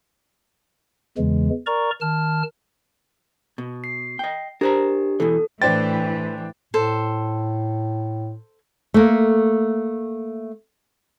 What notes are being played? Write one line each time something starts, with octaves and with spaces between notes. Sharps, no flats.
E2 C#3 E3 G#3
A#4 D5 A#5 C#6
D#3 A5 F6
B2
C7
D#5 G5
D4 G4 A#4 C5 A#5
E2 B2 E3 A4
A2 E3 D4 B4 C5 G5 A6
A2 A4 C5
A3 A#3